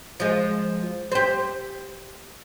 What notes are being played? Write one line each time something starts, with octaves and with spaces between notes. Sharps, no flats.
F3 G#3
G4 C5